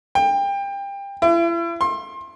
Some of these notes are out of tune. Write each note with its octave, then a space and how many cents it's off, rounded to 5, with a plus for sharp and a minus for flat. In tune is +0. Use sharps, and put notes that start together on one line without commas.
G5 +25
E4 +40
C6 +30